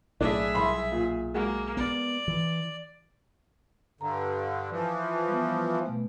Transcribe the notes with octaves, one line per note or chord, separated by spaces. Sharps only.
B1 A2 D4 G#4 E5
C2 B5 C6
A#2
G#3 A#3 F#4
B3 D5
E3
G2 D3 A4 A#5
E3 F3
G3 B3
B2 A3